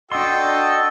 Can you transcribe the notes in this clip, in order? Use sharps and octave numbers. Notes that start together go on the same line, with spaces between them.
D4 F#4 A4 D#5 G5 C6 E6